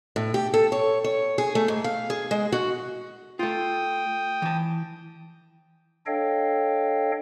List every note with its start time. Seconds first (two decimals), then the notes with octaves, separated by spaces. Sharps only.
0.16 A2
0.34 G4
0.54 A4
0.72 C#5
1.04 C#5
1.38 G#4
1.55 A3
1.68 G#2
1.84 F5
2.10 G#4
2.31 G#3
2.52 F#4
3.39 A3 F4 G5 D#6
4.42 E3 A5
6.06 D4 A4 C#5 D#5 F5 G5